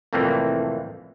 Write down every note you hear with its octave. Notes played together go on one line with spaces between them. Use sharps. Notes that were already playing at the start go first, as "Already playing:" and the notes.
C2 F2 A2 E3 A#3 C4